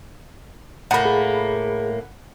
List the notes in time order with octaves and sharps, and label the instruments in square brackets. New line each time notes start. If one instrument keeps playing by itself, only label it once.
[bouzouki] A2 A#3 [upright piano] F#5 B5
[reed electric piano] G#4